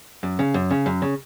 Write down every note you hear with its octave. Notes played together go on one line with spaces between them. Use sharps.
F#2
C#3
F#2
C#3
F#2
C#3